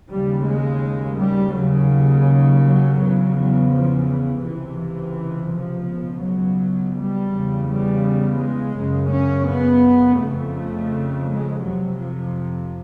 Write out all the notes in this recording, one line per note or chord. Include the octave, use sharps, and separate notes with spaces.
D#2 C#3 G3
G#3
G3
D#2 C#3 F#3
F#3
E2 C#3
F#3
F3
E3
C#2 C3 E3
E3
F3
C#2 B2
F#3
G3
E2 C#3
G3
G#3
F#2 C#3
C#4
B3
F2 C#3 A3
G#3
F2 C3 F#3
F3